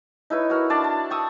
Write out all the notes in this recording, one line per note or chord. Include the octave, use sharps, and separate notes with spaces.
D#4 E4 B4 C#5
F#4 A#4
D4 D5 A5
A5
G5 C#6 D#6 E6